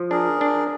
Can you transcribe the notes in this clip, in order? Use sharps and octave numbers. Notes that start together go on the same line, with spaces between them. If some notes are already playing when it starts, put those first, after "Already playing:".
Already playing: F3
D4 G#4 A#4
D4